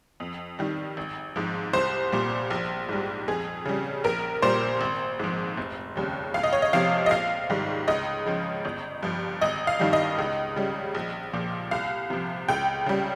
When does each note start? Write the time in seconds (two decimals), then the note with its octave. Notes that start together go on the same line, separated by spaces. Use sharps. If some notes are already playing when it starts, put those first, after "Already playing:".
0.20 F2
0.59 D#3 G3
0.97 G#1
1.36 G#2 F3
1.73 C2 C5
2.12 A#2 G3
2.50 A#1
2.89 G#2 G3
3.28 F2 G#4
3.65 C#3 G3
4.04 A#1 A#4
4.42 A#2 G3 C5
4.81 G#1
5.19 G#2 F3
5.57 F1
5.96 D#2 C#3 G3
6.34 C#2 F5
6.43 D#5
6.53 C#5
6.62 D#5
6.73 C3 F3 F5
7.06 D#5
7.11 A#1 F5
7.50 G#2 D#3 G3
7.88 C#2 D#5
8.26 C#3 F3
8.65 G1
9.03 G2 F3
9.41 G#1 D#5
9.67 F5
9.80 G2 D#3 G3
9.93 D#5
10.18 C#2
10.56 C#3 G3
10.95 A#1
11.33 A#2 F3
11.71 C2 F5
12.10 C3 F3
12.48 C#2 G5
12.86 C#3 G3